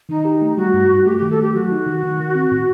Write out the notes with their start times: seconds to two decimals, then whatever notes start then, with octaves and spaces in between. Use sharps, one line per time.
0.09 D#3 D#4
0.25 G4
0.42 A3
0.57 G3 F#4
0.74 G2
0.90 G3
1.05 A3 G4
1.18 D#3 G4
1.31 A4
1.39 A3 G4
1.54 F#3 F#4
1.71 D#4
1.86 D#3
2.03 D#3
2.20 D#3
2.35 C4
2.52 A2